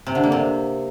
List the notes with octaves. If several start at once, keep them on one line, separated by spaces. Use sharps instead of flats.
C3
D3
A#3
C3